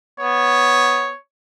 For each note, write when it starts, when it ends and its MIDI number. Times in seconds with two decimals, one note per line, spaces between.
0.20 1.09 59
0.20 1.18 73